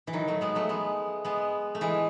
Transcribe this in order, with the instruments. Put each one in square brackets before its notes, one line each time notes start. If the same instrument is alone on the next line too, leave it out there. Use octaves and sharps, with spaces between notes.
[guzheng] E3
D#3 F#3
F#3 A3
G#3 B3
F#3 A3
G#3 B3
G#3 B3
A3
E3 G#3